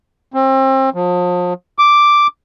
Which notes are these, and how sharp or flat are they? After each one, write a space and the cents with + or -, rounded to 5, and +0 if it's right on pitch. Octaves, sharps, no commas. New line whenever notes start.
C4 +30
F3 +35
D6 +0